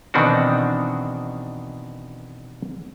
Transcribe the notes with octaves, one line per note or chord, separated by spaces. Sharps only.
B2 D#3 E3 C4 D4 F#4